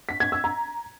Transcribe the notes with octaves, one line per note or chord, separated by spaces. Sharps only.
B6
G#6
E6
A#5